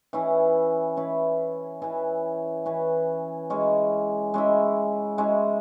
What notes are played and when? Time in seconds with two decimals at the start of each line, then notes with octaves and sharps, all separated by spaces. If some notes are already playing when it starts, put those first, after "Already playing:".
0.13 E3 C#4 E4 B4
0.97 E3 C#4 E4 B4
1.82 E3 C#4 E4 B4
2.65 E3 C#4 E4 B4
3.50 G#3 C#4 E4
4.34 G#3 C#4 E4
5.18 G#3 C#4 E4